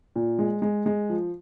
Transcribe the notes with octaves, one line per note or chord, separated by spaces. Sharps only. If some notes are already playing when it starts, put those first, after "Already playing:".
A#2
G#3
G#3
G#3
F3